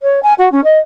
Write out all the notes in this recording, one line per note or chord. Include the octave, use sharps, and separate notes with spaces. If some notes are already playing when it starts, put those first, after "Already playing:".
C#5
G#5
F#4
C#4
D#5